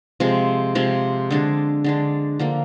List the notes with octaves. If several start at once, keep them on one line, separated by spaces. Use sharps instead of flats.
C3 F3 G#3 C4
C3 F3 G#3 C4
D3 G#3 D4
D3 G#3 D4
D3 F3 A#3